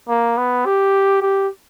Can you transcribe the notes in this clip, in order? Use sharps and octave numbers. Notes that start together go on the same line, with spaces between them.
A#3
B3
G4
G4